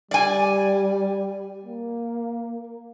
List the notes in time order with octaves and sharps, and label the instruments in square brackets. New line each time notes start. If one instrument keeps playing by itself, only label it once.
[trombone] G3 [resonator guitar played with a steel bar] D5 G#5
[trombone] A#3